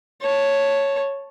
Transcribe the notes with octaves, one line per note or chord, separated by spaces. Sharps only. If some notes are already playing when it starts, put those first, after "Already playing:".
C#5 A5